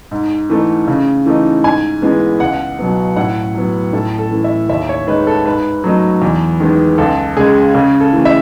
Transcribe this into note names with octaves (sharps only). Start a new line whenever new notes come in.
G#2
E3 A3 D#4
C#3
E3 A3 D#4
G#2 G#5
E3 G#3 B3
C#2 F#5
B2 F#3 B3
A2 F#5
F#3 B3
A2 A4
A4
E3 A3
E5
D#2 E5
C#5
D#3 G#3 D#4 B4
A4
G#2 B4
F#3 A3 D#4
E2
D#3 G#3 B3
C#2 A4
C#3 G#3 G#4
C#3 G#4
A4
E3 A3
E5